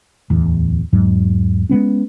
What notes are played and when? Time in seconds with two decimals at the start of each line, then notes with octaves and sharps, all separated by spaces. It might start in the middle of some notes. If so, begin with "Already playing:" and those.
0.30 D1 E2
0.93 E2 G#2 F#3
1.69 G#3 A#3 B3 C#4